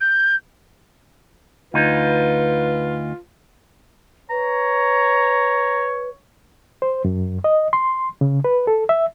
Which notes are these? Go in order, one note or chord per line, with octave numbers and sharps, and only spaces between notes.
G6
D2 D#4 F4 B4
B4 C#5 A#5
C5
F#2
D#5
C6
C#3
B4
A4
E5